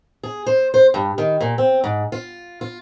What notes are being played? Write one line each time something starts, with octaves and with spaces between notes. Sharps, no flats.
G#4
C5
C5
G2
D#3
A#2
C4
G#2
F4
F4